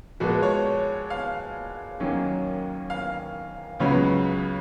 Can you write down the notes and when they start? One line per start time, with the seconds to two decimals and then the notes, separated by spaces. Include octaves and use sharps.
0.20 A#2 F3 G#3 B3 F#4
0.43 C#5
1.10 F5
2.00 D#2 D#3 F#3 A#3 C#4
2.90 F5
3.80 C#2 C#3 F#3 B3 C#5